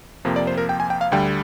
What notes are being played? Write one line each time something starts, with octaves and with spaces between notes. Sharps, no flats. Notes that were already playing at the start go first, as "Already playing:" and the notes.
F2 C3 F3 A#3
D5
C5
A#4
G5
G#5
G5
F5
D2 D3 G3 G5